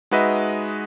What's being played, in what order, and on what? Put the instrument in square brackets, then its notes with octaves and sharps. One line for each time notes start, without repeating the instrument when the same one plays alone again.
[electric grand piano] G#3 D#4 F#4 B4 D#5 E5